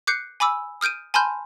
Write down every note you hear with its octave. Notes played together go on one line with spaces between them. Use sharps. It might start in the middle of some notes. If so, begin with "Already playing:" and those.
D6 F#6 G6 C7 C#7
G#5 B5 D6 E6
D#6 F6 G6 D7 D#7
G#5 A5 B5 C6 F6 G6